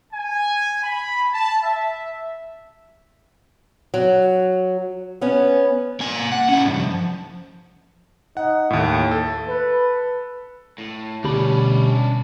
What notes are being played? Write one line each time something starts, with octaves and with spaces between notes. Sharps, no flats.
G#5
B5
A5
E5
F#3
B3 C#4
A#3 G#5
F#5
C#4 E4
C2 G2
F3
D#4 F#5
D#2 A2 A3
A4
B4
A2
D2 B2 G3 C#4 D4 G4 B5